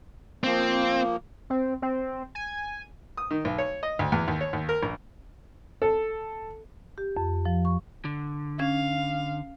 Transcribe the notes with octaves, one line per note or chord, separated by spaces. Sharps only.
F3 A#3 C4
C4
C4
G#5
D#6
D#3
B1
C#5
D#5
D2
E2
D#2
C#5
D#2
A#4
A#1
A4
G4
F2
F3
C#6
D3
C#4 F5 G#6